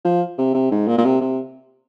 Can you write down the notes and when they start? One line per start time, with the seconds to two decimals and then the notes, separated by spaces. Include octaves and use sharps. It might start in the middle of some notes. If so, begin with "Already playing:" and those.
0.04 F3
0.38 C3
0.54 C3
0.71 G#2
0.88 A#2
0.98 A#2
1.05 C3
1.21 C3